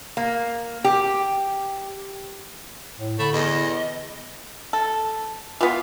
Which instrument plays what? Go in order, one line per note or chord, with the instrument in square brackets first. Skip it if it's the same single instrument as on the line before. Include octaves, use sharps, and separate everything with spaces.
[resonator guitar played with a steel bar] A#3
G4
[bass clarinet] A2
[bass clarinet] D3 [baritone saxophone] A3 [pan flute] B5
[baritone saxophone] E2 [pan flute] D#5
[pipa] A4
[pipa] E3 B3 [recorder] F4